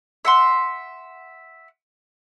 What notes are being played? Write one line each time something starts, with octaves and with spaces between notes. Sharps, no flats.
E5 F#5 C6